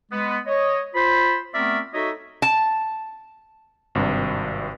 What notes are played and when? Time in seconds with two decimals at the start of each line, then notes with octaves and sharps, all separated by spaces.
0.11 G#3 B3
0.47 C#5 D#5
0.95 F4 C5 B5
1.54 A3 B3 C4 A#4 D5 E5
1.94 D#4 F#4 A4 C#5 D#5 E5
2.42 A5
3.95 G#1 G2 C3